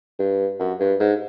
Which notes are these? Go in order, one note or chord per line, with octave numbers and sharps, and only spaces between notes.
G2
F#2
G2
G#2